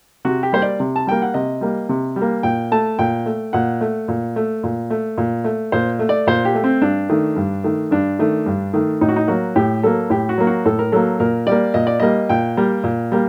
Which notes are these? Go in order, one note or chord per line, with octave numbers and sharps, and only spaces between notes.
C3 F#4
G4
G3 A#3 C5
D5
C3
A5
G3 A#3 G5
F#5
C3 D#5
G3 A#3
C3
G3
A#3
A#2 G5
A3 A5
A#2 G5
A3
A#2 F#5
A3
A#2
A3
A#2
A3
A#2
A3
A#2 C5
A3
D5
A#2 C5
G4
A3
C4
G2 D4
D#3 A3
G2
D#3 A3
G2 D4
D#3 A3
G2
D#3 A3
A2 D#4
F#4
D#4
F#3 A#3 F#4
A2 G4
F#3 A#3 A4
A2 G4
F#4
F#3 A#3
F#4
A2 A4
A#4
F#3 A#3 A4
A#2 A#4
G3 A#3 D5
A#2 D#5
D5
G3 A#3 D#5
A#2 G5
G3 A#3
A#2
G3 A#3